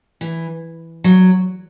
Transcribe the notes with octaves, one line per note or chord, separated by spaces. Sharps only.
E3
F#3